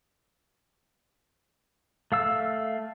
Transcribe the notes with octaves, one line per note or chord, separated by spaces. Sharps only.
A3 F5 E6